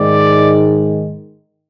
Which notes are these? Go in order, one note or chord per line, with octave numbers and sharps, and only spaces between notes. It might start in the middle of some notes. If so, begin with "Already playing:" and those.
Already playing: G#2 D#3 G#3 D5